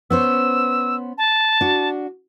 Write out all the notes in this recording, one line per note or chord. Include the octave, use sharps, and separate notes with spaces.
B3 C#4 C5 E6
A5
D4 F#4